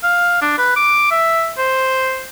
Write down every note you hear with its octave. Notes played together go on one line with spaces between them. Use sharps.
F5
D4
B4
D6
E5
C5